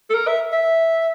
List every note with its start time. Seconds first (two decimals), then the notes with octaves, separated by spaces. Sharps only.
0.10 A4
0.14 A#4
0.27 E5
0.53 E5